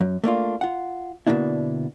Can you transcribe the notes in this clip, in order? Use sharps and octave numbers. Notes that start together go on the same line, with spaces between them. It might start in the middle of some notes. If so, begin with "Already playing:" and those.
F#2
A3 A#3 D4 F4
F4 F#5
B2 D3 A#3 D4 E4